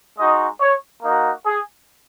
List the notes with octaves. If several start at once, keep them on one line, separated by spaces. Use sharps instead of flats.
G#3 D#4 F#4 D#5
C#5
A#3 D#4 F#4
G#4